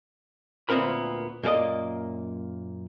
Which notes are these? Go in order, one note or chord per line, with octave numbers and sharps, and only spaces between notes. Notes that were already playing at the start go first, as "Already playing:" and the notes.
D2 A#2 B3 C4 A#4 B5
F#2 A#2 A#3 G#4 D5 D#5